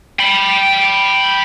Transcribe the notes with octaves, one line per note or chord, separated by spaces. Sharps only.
G5 B5